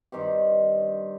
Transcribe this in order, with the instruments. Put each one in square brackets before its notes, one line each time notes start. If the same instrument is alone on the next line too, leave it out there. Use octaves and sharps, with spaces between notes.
[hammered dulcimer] G2 D#3 C4 G4